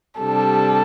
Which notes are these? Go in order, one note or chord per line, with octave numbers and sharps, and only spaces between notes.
C3 G3 D4 A4